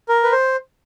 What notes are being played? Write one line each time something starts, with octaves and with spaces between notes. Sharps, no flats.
A#4
B4
C5